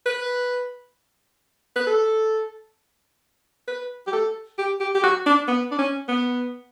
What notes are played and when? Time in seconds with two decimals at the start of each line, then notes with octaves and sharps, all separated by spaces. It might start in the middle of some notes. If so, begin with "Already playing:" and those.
0.06 B4
1.76 B4
1.87 A4
3.68 B4
4.07 G4
4.13 A4
4.58 G4
4.80 G4
4.95 G4
5.03 F#4
5.26 D4
5.48 B3
5.71 D4
5.79 C#4
6.09 B3